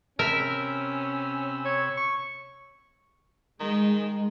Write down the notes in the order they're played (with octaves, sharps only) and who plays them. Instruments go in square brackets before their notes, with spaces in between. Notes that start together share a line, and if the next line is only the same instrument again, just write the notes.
[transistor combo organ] C3 B5 E6 [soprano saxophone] C#4 [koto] A#4 E5
[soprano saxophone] C#5
C#6
[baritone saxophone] D#3 [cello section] G#3